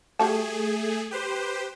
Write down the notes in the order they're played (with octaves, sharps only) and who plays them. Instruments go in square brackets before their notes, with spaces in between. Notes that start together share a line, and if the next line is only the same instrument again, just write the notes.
[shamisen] G3 F#4 A5 [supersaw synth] A3 G#4
[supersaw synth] G4 B4 C5